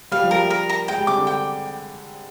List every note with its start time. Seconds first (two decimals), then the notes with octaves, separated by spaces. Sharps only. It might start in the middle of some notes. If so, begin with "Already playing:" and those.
0.11 G3 F5
0.22 F3
0.31 G3 A#4
0.50 A#4
0.69 A#5
0.88 G#3 G5
0.98 G3
1.07 C3 D6
1.18 D3
1.27 G5